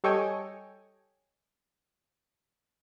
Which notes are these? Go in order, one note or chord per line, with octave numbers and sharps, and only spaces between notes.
G3 A4 C#5 D#5 G5 G#5